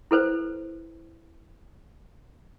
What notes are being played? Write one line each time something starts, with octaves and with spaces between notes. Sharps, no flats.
E4 A4 B4 C5